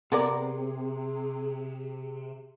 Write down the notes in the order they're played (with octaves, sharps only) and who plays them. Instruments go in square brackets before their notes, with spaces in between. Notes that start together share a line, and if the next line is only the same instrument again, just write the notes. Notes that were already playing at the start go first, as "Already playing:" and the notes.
[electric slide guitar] C3 [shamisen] B3 A#4 D5 [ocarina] G#4